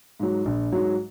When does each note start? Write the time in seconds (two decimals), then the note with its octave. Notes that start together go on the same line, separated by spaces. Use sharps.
0.20 G#2 F#3
0.45 A#1
0.72 G#2 F#3